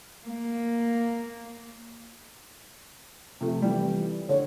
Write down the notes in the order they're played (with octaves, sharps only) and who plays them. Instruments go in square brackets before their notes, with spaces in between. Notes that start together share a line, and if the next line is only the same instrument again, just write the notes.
[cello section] A#3
[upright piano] C3 F3 A3
E3 G3
[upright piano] D3 [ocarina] C#5